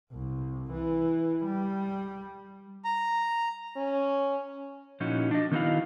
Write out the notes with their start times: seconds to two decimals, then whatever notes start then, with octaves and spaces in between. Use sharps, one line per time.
0.11 C2
0.72 E3
1.44 G3
2.85 A#5
3.77 C#4
5.00 A#2 F3 C#4 D#4 E4 F#4
5.31 D4 D#5
5.51 D#3 B3 D#4 E4 F#4 F5